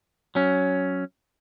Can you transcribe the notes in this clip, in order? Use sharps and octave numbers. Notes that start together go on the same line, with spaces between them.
F#3 C#4